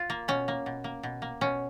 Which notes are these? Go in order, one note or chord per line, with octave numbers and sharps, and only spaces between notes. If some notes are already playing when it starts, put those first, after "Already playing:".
Already playing: F4
A#3
B2 C#4
A#3
B2
A#3
B2
A#3
B2 C#4